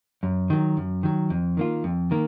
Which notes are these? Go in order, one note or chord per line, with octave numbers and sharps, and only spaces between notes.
F#2
D#3 F#3
F#2
D#3 F#3
F2
D#3 A#3 F4
F2
D#3 A#3